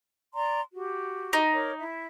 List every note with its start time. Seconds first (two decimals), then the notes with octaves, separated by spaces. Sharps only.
0.33 D5 A#5 C6
0.73 F#4 G4
1.33 D#4
1.52 A#4 C#5 D6
1.79 E4 E5